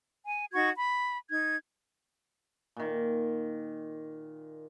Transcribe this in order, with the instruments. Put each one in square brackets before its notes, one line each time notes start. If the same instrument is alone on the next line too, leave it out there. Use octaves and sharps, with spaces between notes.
[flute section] G#5
D#4 F#4 C#6 G#6
B5
D#4 G#6
[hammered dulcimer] A#2 D#3